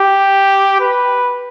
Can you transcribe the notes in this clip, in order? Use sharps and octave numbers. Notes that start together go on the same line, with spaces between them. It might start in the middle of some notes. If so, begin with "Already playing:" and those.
Already playing: G4
B4